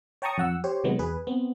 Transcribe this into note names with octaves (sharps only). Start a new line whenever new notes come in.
C#5 G5 A5 A#5 C#6 D#6
F2 F#5 E6
G4 C5 C#5
C3 D#3 F#3 G#3 B3
E2 G#4 B4
B3 C4